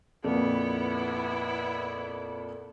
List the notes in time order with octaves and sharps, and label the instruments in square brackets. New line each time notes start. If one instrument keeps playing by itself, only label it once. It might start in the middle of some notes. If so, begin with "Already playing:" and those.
[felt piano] F2 A#2 [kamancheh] B3 E4